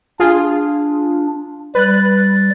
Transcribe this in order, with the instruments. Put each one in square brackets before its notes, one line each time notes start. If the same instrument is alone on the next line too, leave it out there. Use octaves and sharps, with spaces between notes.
[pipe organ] D4 [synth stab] F4 G#4
[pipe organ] G3 A6 [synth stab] B4 F#6